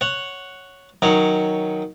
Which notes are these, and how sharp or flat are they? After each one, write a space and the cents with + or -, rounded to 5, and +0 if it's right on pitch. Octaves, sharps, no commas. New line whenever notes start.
C#5 +0 F#5 +0
D#3 +5 F#3 +0 C#4 +0